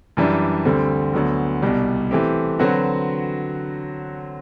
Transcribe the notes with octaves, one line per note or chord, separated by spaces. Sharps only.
F#2 E3 G3 D4
D2 D3 G3 C4
D2 D3 F#3 B3
C2 B2 G3
E3 A3 C4 G4
D3 F#3 C4 F#4 B4